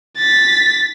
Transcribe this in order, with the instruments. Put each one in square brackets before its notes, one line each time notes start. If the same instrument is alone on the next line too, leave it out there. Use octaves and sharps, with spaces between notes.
[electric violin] A6 B6